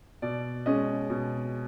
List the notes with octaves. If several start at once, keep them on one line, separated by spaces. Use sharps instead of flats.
B2 D5
G#3 C#4 D#5
B2